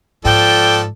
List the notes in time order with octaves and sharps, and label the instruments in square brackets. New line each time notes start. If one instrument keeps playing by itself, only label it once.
[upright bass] G#2 [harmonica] F3 A4 D5 [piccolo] G5